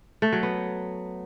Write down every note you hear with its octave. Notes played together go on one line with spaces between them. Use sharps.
A3
F#3
B3